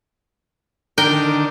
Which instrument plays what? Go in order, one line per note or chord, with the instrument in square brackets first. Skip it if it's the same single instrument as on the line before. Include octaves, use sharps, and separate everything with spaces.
[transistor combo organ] D3 D#3 D4 [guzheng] A#4 G5